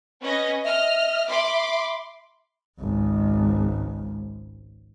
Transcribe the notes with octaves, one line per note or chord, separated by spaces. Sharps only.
C#4 B4 D#5
D#5 E5 F6
B5 C6 D6
G#1 C#2